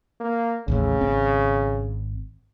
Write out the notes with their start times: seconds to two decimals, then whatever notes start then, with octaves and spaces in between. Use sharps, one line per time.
0.20 A#3
0.68 A1 D#2 A2 C#3
1.01 G#1 C4